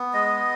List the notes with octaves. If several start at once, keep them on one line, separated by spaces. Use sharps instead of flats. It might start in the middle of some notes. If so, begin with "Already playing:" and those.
Already playing: B3
G#3 D#5